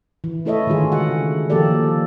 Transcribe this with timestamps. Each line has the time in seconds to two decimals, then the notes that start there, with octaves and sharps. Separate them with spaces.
0.24 E3
0.45 A3 E4 A4 C#5 D#5 E5
0.67 D3 D#3 G#3 F4 G#4
0.92 C#3 F#4 F#5
1.50 D#3 F3 A#3 G4 A4 D5